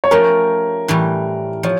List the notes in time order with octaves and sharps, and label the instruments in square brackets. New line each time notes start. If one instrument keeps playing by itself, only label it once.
[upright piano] C#5
[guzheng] F3 A3 C#4 G4 [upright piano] A#4
[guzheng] A2 E3 G3
[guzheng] F3 [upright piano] C#5